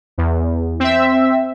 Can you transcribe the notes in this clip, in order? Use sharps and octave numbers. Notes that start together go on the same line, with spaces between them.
E2
C4 E5